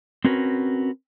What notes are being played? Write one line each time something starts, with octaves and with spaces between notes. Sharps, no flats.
C4 C#4 F#4 A#4 B4